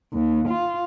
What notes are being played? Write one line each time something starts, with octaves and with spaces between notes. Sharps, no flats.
D#2
F4